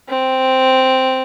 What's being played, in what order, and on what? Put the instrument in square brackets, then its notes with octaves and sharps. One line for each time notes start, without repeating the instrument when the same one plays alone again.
[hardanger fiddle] C4